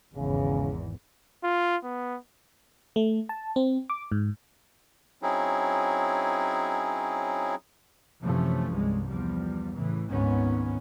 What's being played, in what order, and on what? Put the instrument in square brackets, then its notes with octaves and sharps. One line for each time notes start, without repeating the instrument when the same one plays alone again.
[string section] G#1 E2 [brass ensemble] C#3
[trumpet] F4
B3
[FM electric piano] A3
A5
C4
D6
G#2
[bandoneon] F#3 C4 C#4 D#4 E4 G#4
[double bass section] F#2 C3 E3 F3 A3 C#4
C2 G2 G#3
E2 F3 G3
A2 C#3 E3
G#1 D2 G#2 D#3 B3 C#4